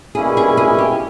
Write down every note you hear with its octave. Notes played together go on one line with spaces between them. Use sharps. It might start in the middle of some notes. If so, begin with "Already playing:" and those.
B2 G3 A#3 C#4 E4 G#4
G#4
G#4
G4